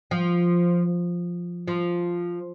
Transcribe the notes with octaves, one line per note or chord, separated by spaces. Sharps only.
F3
F3